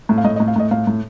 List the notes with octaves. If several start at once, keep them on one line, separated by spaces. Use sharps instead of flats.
A2
F5
A2 D#5
D#5
A2
F5
A2 D#5
A2 F5
A2